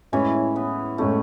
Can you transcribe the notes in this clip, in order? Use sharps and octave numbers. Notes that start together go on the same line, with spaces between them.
A2 E3 G#3 C#4 E4
B3
A2 G#3 A3 C#4 E4